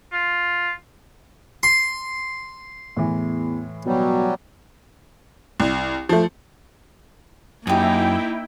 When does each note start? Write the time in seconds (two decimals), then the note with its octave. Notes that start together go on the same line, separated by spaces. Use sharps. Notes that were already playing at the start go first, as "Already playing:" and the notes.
0.12 F4
1.63 C6
2.97 E2 A2 E3
3.86 B2 F#3 G3
5.60 C2
6.09 F3 A3
7.67 F#2 A#3 D#4 E4 G4 D#5 G5